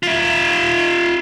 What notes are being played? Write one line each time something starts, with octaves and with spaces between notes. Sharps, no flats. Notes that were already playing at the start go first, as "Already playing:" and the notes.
F4 E5